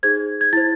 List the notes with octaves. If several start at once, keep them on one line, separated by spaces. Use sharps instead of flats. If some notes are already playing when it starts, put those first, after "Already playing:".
D#4 G#4 C5 G#6
G#6
E4 C5 A6